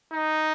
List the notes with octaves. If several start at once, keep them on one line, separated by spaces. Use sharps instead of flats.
D#4